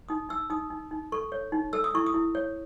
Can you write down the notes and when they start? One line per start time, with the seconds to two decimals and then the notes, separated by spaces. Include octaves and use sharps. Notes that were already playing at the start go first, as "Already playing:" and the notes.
0.09 D#4 D#6
0.29 D#4 E6
0.50 D#4 D#6
0.70 D#4
0.91 D#4
1.12 A4 C#6
1.32 C#5
1.52 D#4
1.73 A4 E6
1.84 D#6
1.94 E4 C#6
2.06 D#6
2.14 E4
2.35 C#5